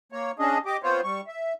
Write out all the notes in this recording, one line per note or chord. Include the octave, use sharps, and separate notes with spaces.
A#3 C#5
C#4 D4 G#4 D#5
G4 D#5 D6
B3 C4 F4 C5 C#5
G3 C#6
E5